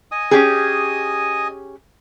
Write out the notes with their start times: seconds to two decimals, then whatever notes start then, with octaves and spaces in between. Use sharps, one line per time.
0.11 D#5 G#5 D#6
0.31 C#4 G4 G#4